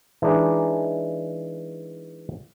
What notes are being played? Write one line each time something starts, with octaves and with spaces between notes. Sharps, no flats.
E3 G#3 D4 D#4